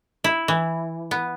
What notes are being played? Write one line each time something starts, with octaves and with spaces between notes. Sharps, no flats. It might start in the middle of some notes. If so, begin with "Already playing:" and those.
E4
E3
B3